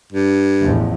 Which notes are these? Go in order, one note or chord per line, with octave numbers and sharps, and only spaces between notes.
G2
A1 E2 F3